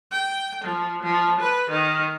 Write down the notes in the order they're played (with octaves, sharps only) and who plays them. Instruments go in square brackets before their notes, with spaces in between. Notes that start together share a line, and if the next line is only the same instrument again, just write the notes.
[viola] G5
F3
F3
B4
D#3